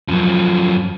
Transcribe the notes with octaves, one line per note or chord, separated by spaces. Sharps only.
F#2 F3